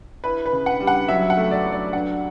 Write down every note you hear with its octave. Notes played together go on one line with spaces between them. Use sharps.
E4 B4
B4
C#3
F#5
G3
F#5
F#3 E5
F#5
A3
D5
F#3
D5
G2 F#5